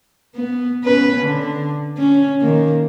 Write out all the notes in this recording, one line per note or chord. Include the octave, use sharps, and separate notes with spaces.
B3
B3 C#4 B4
D3
C#4
D#3 A#3